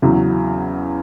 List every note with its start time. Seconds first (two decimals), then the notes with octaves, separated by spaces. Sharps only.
0.02 E2 C#3 F#3